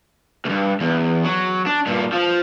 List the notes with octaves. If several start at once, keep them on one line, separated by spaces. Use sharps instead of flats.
D2 G2
E2
F#3
D4
G2 A#2
F3